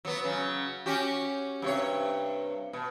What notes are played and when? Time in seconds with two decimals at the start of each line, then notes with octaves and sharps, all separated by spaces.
0.05 F#3 B3
0.24 C#3 F#3
0.86 C#4 F#4 G4
1.62 G2 C3 C#5
2.73 B2